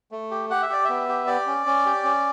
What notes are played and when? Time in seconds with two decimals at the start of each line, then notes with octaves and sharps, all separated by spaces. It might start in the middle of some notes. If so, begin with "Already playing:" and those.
0.11 A3
0.31 G4
0.50 G4 F#5
0.62 E5
0.70 G4 D5
0.85 B3 E5
1.09 G4
1.27 G4 D5
1.47 C#4
1.66 C#4
1.86 G4
2.05 C#4